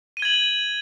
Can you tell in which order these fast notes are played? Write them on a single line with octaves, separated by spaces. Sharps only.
D#7 G7 G#6 F#7